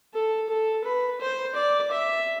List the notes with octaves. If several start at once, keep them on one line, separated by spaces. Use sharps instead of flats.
A4
A4
B4
C5
D5
E5